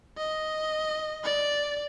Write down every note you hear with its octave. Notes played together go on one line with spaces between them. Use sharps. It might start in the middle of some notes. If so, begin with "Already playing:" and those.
D#5
D5